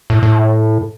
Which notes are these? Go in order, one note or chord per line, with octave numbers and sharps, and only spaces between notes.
A2
A2